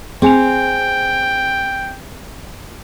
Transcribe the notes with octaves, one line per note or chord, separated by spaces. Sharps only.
C4 G#4 G5 G#5 F7